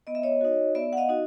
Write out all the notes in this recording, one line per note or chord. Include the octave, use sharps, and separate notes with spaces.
B3 D#5
E5
C#5 D#5
D#4 F#4
B3 D5 E5
F#5
D#5 F5
D#4 F#4